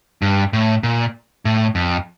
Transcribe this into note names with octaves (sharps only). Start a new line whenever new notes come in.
G2
A2
A#2
A2
F2